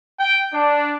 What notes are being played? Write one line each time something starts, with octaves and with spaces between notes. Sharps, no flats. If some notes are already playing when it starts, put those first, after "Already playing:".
G5
D4